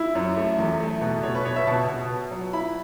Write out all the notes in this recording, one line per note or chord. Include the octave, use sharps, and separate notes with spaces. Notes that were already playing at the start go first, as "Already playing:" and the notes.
Already playing: E4
F#2
A3
E2
A3
B2
B2 C#5
B4
B2 C#5
E5
B2 A5
B2
B3
F#3
E4 B5